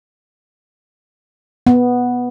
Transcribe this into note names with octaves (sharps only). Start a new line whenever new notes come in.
B3